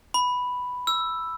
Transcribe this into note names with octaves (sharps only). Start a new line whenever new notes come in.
B5
E6